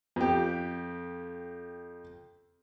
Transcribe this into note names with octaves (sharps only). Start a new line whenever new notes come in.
F2 G4